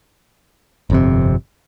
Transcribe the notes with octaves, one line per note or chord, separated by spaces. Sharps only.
G1 F2 C3